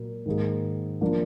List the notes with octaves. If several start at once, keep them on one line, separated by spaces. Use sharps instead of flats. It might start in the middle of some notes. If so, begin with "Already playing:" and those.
Already playing: A#2 F#3 A#3
G#2 D#3 A#3 D#4 G#4
F3 A#3 D4